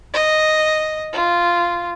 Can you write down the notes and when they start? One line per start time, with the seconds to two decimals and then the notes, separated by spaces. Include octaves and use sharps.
0.14 D#5
1.13 F4